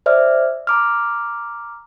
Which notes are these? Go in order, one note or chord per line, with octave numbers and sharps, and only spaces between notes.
C5 D5 E5 F6
A#5 D6 F6